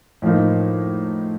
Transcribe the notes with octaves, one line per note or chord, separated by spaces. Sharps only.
A2 F3 A#3 D#4